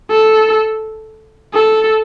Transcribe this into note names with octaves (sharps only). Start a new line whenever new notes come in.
A4
A4